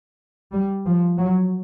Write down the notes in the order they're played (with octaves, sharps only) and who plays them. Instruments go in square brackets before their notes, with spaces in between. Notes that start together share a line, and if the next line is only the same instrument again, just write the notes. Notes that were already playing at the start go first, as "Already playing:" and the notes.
[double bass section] G3
F3
F#3